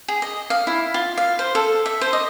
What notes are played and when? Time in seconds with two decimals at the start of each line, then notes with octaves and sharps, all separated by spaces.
0.08 G#4
0.22 D#5
0.50 F5
0.67 E4
0.94 F4
1.18 F5
1.39 C5
1.55 A4
1.86 E5
2.01 C5
2.13 D#5